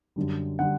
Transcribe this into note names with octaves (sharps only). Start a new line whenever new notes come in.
F#2 D3 G3
D3 G3 F#5